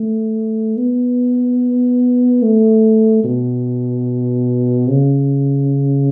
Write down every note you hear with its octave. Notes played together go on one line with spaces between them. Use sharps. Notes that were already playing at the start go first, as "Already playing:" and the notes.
Already playing: A3
B3
A3
B2
C#3